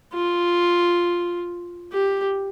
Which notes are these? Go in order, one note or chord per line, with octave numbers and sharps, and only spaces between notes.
F4
G4